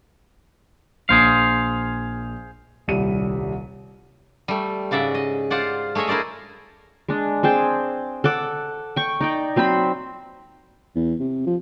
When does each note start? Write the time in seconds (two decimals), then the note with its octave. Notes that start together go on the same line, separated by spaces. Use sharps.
1.09 A#1 G#4 C5 F5
2.88 D#1 C2 G3 D#7
4.48 G3 A3
4.91 G#2 C#3 D5 E5 F#5
5.14 D#5
5.50 F4 C5 D5 F#5
5.95 A3 G#4 C#5 D#5 E5
6.08 E4 A#4 C5 D5 D#5
7.09 G#3 D4
7.43 C4 G#4 G5 A5
8.24 A4 F#5 D6
8.96 G5 C#6
9.21 D#4 D5 G5
9.56 F#3 C4 C5 B5
10.95 E2
11.19 C3
11.47 F3